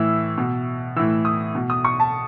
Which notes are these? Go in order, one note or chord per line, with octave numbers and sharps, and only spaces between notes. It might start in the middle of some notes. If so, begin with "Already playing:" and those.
Already playing: A2 E3 E6
B2
A2 E3 E6
D#6
B2
D#6
C#6
A5